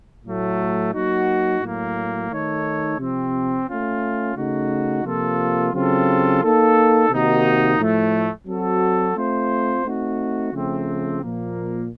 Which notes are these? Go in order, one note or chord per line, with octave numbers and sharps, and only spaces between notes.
A2 F#3 A3
F#3 A#3 D#4 F#4
A2 F#3 A#3
D#3 A3 D#4 A4 C#5
C3 F3 C4
A3 C#4 F4
C#3 A3 D#4 F#4
C3 F3 A#3 F4 A4
C#3 F#3 C4 F4 A4
A#3 D#4 A4
C3 D#3 A#3 D#4 F#4
A2 F3 A3
F#3 C4 F#4 A4
A3 C4 F4 C5
A3 C4 D#4 F#4
C#3 F3 A3 C4
A#2 F3 A#3